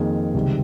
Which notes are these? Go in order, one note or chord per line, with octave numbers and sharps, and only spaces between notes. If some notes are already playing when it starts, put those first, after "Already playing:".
Already playing: F2 D#3 A#3 G#4
C#2 C3 D#3 G3